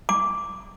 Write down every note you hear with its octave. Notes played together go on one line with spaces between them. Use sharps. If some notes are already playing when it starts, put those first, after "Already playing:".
D6